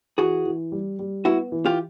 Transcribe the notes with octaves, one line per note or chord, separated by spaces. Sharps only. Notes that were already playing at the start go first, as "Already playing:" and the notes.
E3 F#4 G#4
E3
G3
G3
B3 E4 F#4
E3
F4 G4